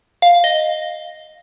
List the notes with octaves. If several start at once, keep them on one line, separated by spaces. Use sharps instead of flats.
F5
D#5